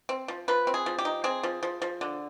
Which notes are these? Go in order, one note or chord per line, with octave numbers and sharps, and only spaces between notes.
C4
F3
F3 B4
C4
G#4
F3
G4
D#4
C4 G#4
F3
F3
F3
D3